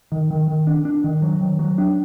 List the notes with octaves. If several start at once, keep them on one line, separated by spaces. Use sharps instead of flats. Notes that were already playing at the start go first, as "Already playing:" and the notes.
D#3
D#3
D#3
D4
D4
D#3
F#3
D#3
F#3
D4